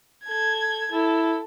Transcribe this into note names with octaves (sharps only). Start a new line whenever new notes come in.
A4 G#6
E4 A4